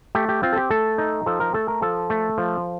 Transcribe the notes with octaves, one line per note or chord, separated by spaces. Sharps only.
A3 G4
G4
C4 F4
A4
G4
A3 A4
D#4
F3 A4
A#4
A3 A4
A#4
F3 A4
A3
F3